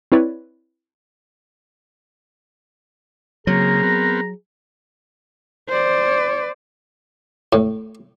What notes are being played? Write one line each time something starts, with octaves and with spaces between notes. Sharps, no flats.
C4 E4 B4 C#5 D5
C#3 F#3 A#3 C4 G#4 A#5
B3 C4 A#4
C5 D5
A2